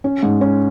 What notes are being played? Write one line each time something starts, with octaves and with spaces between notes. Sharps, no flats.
C#4
G#2
C#4